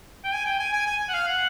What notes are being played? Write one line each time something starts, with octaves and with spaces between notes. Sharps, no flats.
G5
G#5
G5
G#5
G#5
G#5
F#5
F5
F#5